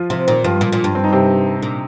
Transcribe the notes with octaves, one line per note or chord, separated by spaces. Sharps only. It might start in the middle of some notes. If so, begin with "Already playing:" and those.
Already playing: F3 F4
C3 F3 F4
A#2 D#3 D#4
G2 F3 F4
A#2
A#2
G2
C4
D#4
C3 C4
A#2